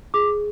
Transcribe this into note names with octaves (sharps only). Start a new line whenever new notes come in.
G#4 D6